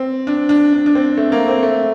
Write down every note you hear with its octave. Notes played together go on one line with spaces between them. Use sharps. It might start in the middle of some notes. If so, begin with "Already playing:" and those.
Already playing: C4
D4
D4
D4
D4
C4
A3
A#3
C4
A3